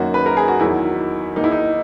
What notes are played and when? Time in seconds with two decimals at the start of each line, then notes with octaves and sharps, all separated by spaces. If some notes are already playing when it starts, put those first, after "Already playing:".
Already playing: F#2 D#3 F#3 A#3 F#4
0.14 B4
0.26 A#4
0.37 G#4
0.48 F#4
0.59 E2 D#3 F#3 E4
1.36 E2 D#3 A#3 D#4
1.44 E4
1.51 D#4